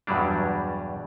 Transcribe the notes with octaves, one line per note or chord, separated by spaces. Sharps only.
E2 G2 B2 F#3 G3 D4